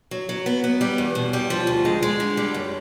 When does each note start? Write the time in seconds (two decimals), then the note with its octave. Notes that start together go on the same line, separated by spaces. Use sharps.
0.11 F#3
0.29 F#3
0.46 B3
0.64 B3
0.81 G3
0.98 E2
1.15 B2
1.33 G3
1.50 F3
1.67 D2
1.85 G#3
2.03 G#3
2.20 D3
2.37 G3
2.54 F#2